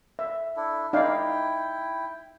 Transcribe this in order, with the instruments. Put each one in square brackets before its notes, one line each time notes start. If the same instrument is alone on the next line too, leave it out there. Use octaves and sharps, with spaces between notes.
[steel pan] E5
[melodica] D4 E4 A4
[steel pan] D#4 D5 F5 [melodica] E4 G5